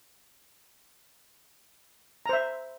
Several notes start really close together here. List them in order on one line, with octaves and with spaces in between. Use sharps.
A#5 C5 E5